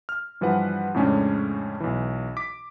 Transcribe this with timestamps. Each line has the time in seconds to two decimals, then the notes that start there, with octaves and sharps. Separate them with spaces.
0.09 F6
0.41 G2 E3 F3 G3 B4 F#5
0.94 F2 A2 C#3 G#3 C#4 D4
1.80 B1 E3
2.37 D6 B6